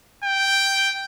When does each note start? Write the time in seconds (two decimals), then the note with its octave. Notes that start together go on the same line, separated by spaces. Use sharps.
0.24 G5